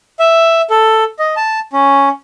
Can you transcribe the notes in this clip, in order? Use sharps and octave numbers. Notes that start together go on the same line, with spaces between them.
E5
A4
D#5
A5
C#4